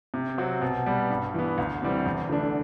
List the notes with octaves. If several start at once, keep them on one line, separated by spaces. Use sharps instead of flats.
C3
F#3 C4 F#4
B2
G3 B3
G2
E3 B3
D2
C3 E3 G3 C4
E2
D3 A3 D4